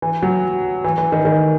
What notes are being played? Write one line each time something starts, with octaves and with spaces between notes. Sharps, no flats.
E3
F#3
E3
E3
D#3
D#3